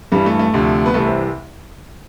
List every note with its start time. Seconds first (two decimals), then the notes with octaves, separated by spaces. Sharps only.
0.12 G2 E3 G3
0.26 A3
0.39 A3
0.54 D2 C3 F3
0.86 B3
0.94 C2 C3 E3 A3
1.08 C4